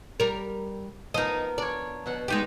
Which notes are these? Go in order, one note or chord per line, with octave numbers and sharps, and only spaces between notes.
G3 A#4
F3 B3 D#4 A#4 D#5
D4 C#5 D5
B2 F#3 F#5
G#3 D#4 G4